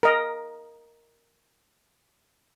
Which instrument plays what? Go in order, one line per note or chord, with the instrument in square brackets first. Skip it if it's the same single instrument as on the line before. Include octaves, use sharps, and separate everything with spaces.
[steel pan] A#4 D#5